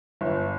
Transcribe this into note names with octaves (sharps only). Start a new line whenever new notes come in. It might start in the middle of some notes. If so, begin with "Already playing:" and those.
G1